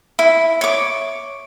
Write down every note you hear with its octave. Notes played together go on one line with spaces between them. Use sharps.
E4
C#5 D6